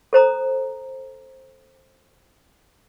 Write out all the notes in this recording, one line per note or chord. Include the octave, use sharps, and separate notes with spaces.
A4 C5 A#5 D#6